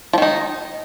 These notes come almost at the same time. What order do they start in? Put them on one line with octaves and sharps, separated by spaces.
F3 D#3 D#4